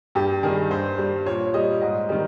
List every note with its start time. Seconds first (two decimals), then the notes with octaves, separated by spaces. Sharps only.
0.15 G2 G4
0.43 D#3 G3 G#4
0.71 G2 C5
0.98 G3
1.26 A#2 C#5
1.54 G3 D#5
1.81 G#2 D#5
2.09 D#3 G3